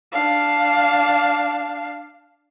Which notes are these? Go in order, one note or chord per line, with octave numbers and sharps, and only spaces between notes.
D4 F5